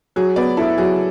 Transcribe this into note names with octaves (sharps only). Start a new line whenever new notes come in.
F#3 G#4
B3 D5
E4 A4
F#3 G#4